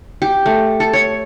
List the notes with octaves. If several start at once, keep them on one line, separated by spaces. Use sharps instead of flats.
G4
A3
A4
C#5